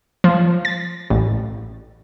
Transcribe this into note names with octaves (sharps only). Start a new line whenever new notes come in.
F3
A6
A1